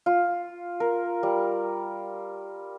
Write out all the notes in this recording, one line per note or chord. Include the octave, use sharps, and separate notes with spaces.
F4
A#4
G3